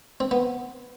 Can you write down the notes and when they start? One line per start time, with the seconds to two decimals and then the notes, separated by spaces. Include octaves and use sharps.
0.20 C4
0.31 B3